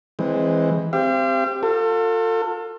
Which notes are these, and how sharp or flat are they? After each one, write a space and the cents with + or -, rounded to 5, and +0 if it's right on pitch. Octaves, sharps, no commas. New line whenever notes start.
E3 +0 G#3 +0 C4 +20
C4 +0 G4 +10 F5 -40
F4 +35 A4 +35